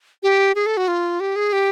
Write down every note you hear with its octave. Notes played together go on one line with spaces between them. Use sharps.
G4
G#4
A4
F#4
F4
G4
G#4
G4